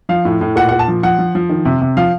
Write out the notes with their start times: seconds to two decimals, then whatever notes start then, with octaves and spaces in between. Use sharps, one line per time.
0.09 F3 F5
0.25 A2
0.41 A2
0.56 A#2 F#5
0.69 A#2 F#5
0.79 A5
0.88 F3
1.03 F3 F#5
1.19 F3
1.35 F3
1.49 D#3
1.65 C3
1.81 C3
1.97 F3 F5